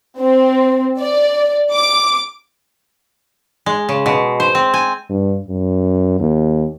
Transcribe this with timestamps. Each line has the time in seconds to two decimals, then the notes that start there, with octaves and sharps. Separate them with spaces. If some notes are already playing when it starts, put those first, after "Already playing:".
0.20 C4
0.99 D5
1.72 D6
3.66 G#3
3.89 C#3
4.06 B2
4.40 C5
4.55 C4
4.74 G#5
5.10 G2
5.48 F#2
6.20 D#2